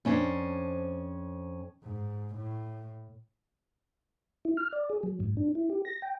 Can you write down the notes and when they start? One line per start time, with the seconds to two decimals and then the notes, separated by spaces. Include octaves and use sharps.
0.05 F2 C#4 D4 C5
1.84 G#2
2.35 A2
4.45 E4
4.57 F6
4.72 D5
4.90 G#4
5.03 F#3
5.20 G#2
5.37 D4
5.55 E4
5.70 G4
5.85 A#6
6.02 G5